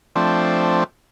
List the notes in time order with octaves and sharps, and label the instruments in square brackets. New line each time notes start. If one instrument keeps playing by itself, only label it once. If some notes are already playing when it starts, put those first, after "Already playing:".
[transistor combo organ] F3 A3 C4 D4